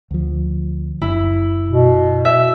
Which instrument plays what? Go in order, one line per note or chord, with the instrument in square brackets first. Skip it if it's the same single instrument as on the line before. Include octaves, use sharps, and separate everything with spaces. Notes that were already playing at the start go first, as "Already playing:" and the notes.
[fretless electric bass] D2 F3
[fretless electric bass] F#1 [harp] E4
[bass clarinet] B2
[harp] E5